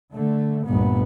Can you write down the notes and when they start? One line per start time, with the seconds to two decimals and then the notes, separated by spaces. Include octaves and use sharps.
0.14 D3 A3
0.67 G1 D2 G2 A#2 B3